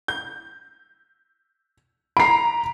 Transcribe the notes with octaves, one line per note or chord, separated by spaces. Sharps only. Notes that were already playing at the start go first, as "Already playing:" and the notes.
G6
A#5 B5 C7 D7